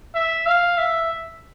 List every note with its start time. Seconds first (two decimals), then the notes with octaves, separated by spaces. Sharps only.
0.15 E5
0.46 F5
0.78 E5